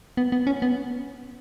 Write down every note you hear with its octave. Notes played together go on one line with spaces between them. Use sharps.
B3
B3
C#4
B3